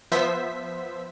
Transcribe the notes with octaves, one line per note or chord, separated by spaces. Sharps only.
F3 B3 C5 E5 B6